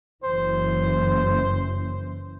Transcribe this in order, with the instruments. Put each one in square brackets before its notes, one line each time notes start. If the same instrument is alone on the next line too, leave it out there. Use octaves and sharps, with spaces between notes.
[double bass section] F#1 E3 [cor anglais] C5